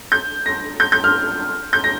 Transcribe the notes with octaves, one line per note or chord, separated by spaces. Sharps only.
G6
A#6
G6
G6
F6
G6
A#6